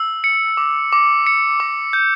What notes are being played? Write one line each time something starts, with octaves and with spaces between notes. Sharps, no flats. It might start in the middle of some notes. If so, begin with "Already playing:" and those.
Already playing: E6
C#7
D6
D6
C#7
D6
G6